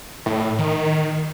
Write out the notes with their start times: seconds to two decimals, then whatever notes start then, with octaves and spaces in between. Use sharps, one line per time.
0.26 A2
0.58 D#3